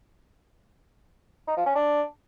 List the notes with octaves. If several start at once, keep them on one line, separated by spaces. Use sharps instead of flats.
D#4
F3
C#4
D4